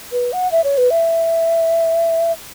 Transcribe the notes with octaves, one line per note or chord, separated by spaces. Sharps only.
B4
F#5
E5
C#5
B4
E5